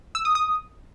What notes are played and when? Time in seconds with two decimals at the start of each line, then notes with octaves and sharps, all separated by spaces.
0.15 E6
0.25 D#6
0.35 D#6